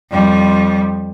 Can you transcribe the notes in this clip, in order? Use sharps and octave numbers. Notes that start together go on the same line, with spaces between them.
F2 G3